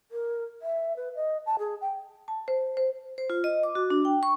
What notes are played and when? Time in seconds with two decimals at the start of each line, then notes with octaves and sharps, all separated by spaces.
0.11 A#4
0.62 E5
0.97 B4
1.16 D#5
1.46 A5
1.59 G#4
1.81 G5
2.28 A5
2.48 C5
2.77 C5
3.18 C5
3.30 F4
3.44 D#5
3.63 D6
3.75 F#4
3.90 D4
4.05 G5
4.23 C#6